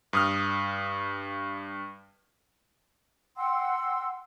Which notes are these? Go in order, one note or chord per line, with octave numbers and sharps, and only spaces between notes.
G2 D#6 F6
F#5 G5 C6 E6